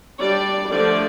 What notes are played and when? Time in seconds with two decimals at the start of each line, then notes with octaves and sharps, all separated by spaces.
0.20 G3 D4 D5
0.71 D3 F3 A3 D5